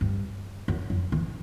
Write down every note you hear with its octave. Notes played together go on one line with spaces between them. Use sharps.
G2
F#2
F#2
E3